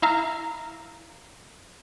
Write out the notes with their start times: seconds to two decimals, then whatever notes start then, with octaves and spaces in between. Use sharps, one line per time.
0.02 E4 E5 F5 A#5